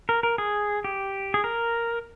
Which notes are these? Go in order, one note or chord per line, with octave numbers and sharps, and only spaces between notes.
A#4
A#4
G#4
G4
G#4
A#4